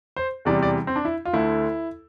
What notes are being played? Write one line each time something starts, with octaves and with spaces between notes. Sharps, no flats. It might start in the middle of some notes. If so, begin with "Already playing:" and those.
C5
E2 C3 E3 G3 D5
D5
C4
D4
E4
F4
D2 D3 A3 E4